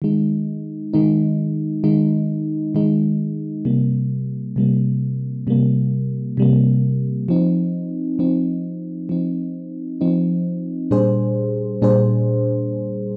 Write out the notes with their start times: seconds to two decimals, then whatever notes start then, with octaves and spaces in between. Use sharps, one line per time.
0.02 D#3 G#3 D#4
0.93 D#3 G#3 D#4
1.84 D#3 G#3 D#4
2.75 D#3 G#3 D#4
3.65 C3 G3 A#3
4.56 C3 G3 A#3
5.47 C3 G3 A#3
6.37 C3 G3 A#3
7.28 F3 C4 D#4
8.19 F3 C4 D#4
9.09 F3 C4 D#4
10.01 F3 C4 D#4
10.91 A#2 G3 D4 G#4 C5
11.82 A#2 G3 D4 G#4 C5